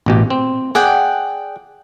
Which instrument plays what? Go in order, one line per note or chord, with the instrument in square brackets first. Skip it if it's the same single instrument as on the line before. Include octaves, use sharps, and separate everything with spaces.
[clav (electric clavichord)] A1 B2 G4
C4
[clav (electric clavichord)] G#4 [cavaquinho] D5 F#5 G5